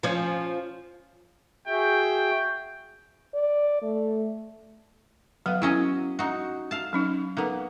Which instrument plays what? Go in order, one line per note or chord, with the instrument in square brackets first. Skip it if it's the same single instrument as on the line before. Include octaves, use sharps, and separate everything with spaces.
[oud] F3 C#4
[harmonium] F#4 G#4 E5 [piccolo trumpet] G5
[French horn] D5
A3
[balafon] F#3 F5 [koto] B3
[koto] F#3 C#4 D#5 [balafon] E4
[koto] D#4 F#4
F5 A5
[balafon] F#3 C#4 D#4
[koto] A#3 B3 [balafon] D#4 A4